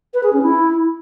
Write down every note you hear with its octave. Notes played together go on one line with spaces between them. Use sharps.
B4
G#4
C#4
E4